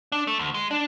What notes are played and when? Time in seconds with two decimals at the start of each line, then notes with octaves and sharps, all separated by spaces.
0.12 D4
0.27 A3
0.39 D2
0.54 G#3
0.71 D4